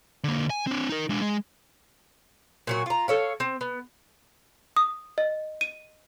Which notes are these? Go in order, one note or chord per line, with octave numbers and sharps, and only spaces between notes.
D3 A#3
G#5
C4 D4
D#4 A#4
G#3 D4
G#3
A#2 F#3 F#4
F4 A#5
A4 C#5 F5
C4
B3
D#6
D#5
D#7